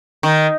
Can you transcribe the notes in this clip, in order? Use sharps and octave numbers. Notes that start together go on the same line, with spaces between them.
D#3